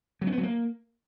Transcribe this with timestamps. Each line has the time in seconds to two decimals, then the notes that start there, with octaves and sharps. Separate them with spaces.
0.21 F#3
0.27 C#4
0.32 B3
0.38 F#3
0.43 A#3